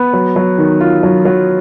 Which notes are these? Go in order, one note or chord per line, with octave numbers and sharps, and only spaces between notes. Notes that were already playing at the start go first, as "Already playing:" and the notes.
Already playing: B3
F#3
F#3
D#3
F4
F#3
F#3